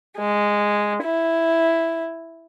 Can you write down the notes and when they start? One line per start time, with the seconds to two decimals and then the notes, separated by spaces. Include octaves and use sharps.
0.18 G#3
1.02 E4